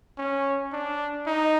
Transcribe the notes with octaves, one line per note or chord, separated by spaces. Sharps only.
C#4
D4
D#4